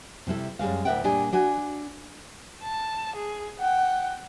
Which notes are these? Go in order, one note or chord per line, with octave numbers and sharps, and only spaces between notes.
C3 G3 E4 A4
F#2 G3 G#3 F5
D2 A2 A#4 E5 F#5 G5
A#2 G3 D4 G4 D#5 G#5
D4 F#4 G#5
A5
G#4
F#5 G5